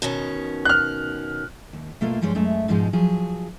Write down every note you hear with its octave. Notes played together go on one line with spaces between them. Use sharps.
B2 D#3 C#4
F6 F#6
D#2
B2 A3 A#3 F4 A4
G2 F3 G3 G#3 C#5
F#2 G#3 A3 E5
G#2 B2 F3 G#3 D#4
F3 F#3 G#4